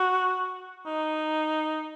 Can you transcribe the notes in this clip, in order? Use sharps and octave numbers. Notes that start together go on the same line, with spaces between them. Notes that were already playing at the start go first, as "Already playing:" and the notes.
Already playing: F#4
D#4